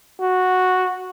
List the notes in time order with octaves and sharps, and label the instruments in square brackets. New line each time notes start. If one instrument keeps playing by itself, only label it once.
[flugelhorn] F#4